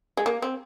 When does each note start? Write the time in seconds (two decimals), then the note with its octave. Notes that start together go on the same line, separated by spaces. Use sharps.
0.17 G#3
0.26 A#3
0.42 C4